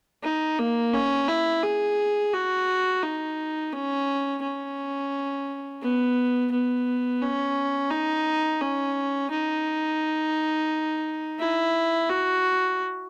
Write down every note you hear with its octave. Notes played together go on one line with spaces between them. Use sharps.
D#4
A#3
C#4
E4
G#4
F#4
D#4
C#4
C#4
B3
B3
C#4
D#4
C#4
D#4
E4
F#4